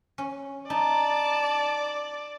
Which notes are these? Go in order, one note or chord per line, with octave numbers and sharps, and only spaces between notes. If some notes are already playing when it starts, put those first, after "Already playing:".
C#4
D#4 D5 A5